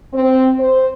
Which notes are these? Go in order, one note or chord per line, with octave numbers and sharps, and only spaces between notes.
C4
C5